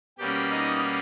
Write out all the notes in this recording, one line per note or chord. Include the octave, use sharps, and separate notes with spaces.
B2 G3 A#3 C#4 G4 G5
D#4 D#5